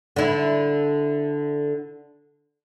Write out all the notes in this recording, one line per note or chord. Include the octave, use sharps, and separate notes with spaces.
D3 E4